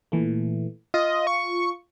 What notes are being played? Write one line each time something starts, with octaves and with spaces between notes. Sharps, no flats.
A#2 E3 A3
F4 D#5
C#6